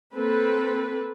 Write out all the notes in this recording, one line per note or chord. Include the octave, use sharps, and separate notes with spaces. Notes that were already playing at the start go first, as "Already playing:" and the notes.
A#3 C4 A4 B4